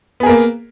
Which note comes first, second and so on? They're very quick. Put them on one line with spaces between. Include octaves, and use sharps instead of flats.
B3 G#4 A#4 A#3